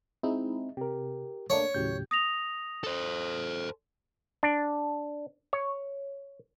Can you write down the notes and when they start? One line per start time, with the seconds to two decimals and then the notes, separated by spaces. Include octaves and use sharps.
0.23 G#3 C4 D#4 E4
0.77 C3 G4 A#4
1.50 A3 A#3 D4 C#5
1.74 D#2 A2 C#3 F#3 G4 G6
2.11 D#6 A#6 F7
2.84 A4 C5
4.43 D4
5.53 C#5